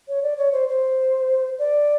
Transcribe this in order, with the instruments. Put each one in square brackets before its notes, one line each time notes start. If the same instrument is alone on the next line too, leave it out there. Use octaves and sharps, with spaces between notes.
[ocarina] C#5
D5
C#5
C5
C5
D5